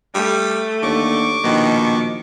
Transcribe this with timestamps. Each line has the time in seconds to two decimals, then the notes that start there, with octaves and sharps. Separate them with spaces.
0.15 G3 A3
0.83 D#2 D3 C#6 D6
1.44 A#1 B2 D#3